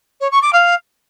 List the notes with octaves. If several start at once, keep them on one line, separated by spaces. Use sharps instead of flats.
C#5
C#6
D6
F5